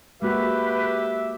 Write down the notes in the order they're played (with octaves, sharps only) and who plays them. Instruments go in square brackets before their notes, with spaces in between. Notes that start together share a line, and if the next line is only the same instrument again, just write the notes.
[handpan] G#3 A#3 F#4 [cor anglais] G4 [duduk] B4 [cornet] E5